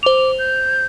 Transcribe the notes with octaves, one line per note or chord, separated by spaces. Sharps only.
C5 D6 F7
G6